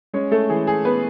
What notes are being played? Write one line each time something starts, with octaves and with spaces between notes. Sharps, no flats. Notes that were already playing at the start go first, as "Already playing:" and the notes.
G#3 C#4 C#5
A3 A4
E3 G#4
G#4
B3 B4